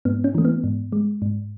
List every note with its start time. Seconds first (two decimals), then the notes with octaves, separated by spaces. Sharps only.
0.05 G#2 B3
0.24 C#4
0.35 E3 A3
0.45 B3
0.64 G#2
0.92 G#3
1.22 G#2